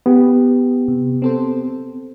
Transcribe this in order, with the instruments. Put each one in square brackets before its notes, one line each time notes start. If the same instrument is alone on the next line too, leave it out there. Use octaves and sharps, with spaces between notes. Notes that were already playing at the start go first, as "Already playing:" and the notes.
[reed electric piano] B3 G4
[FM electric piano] C3
C4 A4 C5